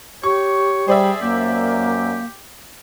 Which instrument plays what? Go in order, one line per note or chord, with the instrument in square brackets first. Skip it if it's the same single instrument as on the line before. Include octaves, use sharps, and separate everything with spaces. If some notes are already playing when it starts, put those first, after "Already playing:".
[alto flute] G4 [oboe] C#5 [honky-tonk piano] C#6
[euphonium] G3 [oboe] G#4 [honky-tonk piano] C5 D5 E5
[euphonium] F#2 [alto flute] A#3 [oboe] G4